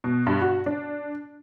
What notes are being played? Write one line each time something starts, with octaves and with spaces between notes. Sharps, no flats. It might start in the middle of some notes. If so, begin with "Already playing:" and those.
B2
G2
F#4
D4